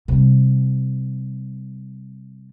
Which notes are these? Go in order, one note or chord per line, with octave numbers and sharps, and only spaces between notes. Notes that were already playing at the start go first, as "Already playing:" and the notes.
C3 G3